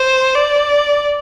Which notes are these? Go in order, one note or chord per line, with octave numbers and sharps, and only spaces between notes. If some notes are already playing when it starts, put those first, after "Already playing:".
Already playing: C5
D5